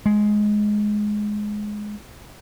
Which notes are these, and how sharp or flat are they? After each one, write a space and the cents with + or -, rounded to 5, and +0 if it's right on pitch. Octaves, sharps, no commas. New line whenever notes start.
G#3 +10